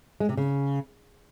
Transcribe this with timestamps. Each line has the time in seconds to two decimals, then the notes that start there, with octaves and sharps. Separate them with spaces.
0.20 G#3
0.29 C3
0.37 C#3